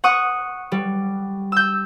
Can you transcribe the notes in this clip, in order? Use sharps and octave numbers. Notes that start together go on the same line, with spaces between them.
F#5 C#6 D#6
G3
E6 G6